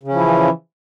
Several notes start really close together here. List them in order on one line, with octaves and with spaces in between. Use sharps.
C#3 C#4 F3 E4 E3